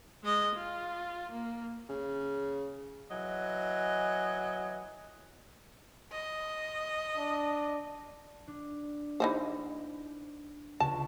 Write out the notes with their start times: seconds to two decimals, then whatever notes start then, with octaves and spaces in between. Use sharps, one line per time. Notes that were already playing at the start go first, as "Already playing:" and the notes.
0.24 G#3 D#5
0.56 F4
1.31 A#3
1.89 C#3
3.11 E3 F#3 D#5
6.12 D#5
7.17 D4
8.48 D4
9.20 E3 D#4 C5
10.80 C#2 A5